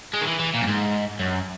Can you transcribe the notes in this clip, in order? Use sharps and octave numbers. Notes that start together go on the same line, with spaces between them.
G#3
D#3
E3
E3
A#2
F#2
G#2
F#2